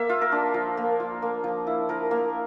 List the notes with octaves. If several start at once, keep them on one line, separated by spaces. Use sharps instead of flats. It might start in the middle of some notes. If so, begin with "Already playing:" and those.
Already playing: A#3 E5
F4
A#4
D4
F3
A#3
F4
A#3
F3
E4
F3 A#4
A#3